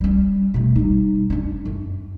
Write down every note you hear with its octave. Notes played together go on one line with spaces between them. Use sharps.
G3 C#4
B2 A3
G3 D#4
C#4 D4
F#2